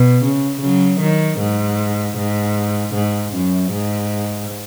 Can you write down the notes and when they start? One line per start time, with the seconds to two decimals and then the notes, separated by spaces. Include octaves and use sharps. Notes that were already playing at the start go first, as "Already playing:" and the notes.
Already playing: B2
0.23 C#3
0.61 C#3 F#3
1.00 D#3
1.40 G#2
2.18 G#2
2.94 G#2
3.34 F#2
3.72 G#2